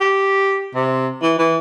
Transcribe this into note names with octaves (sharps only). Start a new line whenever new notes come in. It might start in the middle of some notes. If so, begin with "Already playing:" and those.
G4
C3
E3
E3